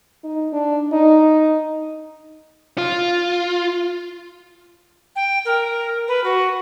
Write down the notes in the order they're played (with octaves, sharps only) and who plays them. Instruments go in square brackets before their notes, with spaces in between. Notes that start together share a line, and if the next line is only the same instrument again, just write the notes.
[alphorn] D#4
D4
D#4
[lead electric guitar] F4
[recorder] G5
A#4
B4
F#4